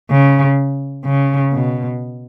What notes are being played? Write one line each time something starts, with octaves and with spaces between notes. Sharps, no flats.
C#3
C#3
B2